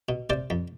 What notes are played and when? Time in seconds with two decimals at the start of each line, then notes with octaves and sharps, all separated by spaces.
0.09 B2
0.30 C3 C5 D5
0.50 F2